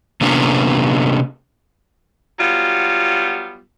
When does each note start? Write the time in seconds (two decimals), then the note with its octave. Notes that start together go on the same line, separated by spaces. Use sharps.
0.21 C3 A#3 B3 C#4 D4 F4
2.39 F#3 G3 B3 F4